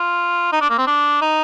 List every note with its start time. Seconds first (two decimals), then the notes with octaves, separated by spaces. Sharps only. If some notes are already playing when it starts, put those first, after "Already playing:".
Already playing: F4
0.53 D#4
0.61 D4
0.70 A#3
0.78 C4
0.87 D4
1.22 D#4